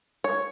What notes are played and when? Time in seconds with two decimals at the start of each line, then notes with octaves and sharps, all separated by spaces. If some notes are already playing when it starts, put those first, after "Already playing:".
0.24 C#5